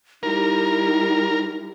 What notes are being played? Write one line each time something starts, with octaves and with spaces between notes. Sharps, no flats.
G3 D#4 E4 A#4